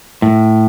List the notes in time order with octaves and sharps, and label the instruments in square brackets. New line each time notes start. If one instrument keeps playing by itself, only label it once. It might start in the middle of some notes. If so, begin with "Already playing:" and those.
[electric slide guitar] A2